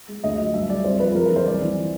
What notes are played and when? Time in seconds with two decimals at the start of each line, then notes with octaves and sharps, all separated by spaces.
0.08 G#3
0.24 D2 D#5
0.38 F#3
0.53 G2 E5
0.69 G3 D5
0.84 C2 C5
1.00 F3 B4
1.15 F2 A#4
1.26 B4
1.31 E3
1.36 C5
1.45 C2 D5
1.61 E3